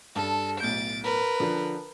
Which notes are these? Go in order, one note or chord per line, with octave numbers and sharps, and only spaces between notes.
G2 A4 A5
B1 A2 G6 A6 D7
A#4 B4
D3 F3